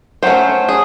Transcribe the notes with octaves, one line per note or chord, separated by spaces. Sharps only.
F#3 A3 C#4 C5
G#4